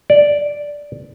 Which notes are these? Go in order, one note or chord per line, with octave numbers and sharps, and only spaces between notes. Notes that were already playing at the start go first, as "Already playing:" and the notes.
D5